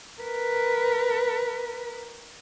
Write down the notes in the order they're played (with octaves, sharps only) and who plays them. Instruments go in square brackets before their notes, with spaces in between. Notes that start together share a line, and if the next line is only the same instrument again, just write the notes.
[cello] A#4 B4